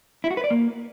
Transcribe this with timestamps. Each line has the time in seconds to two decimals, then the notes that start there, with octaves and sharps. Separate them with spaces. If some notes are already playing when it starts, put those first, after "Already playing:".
0.24 E4
0.31 F#4
0.37 B4
0.44 D5
0.50 A#3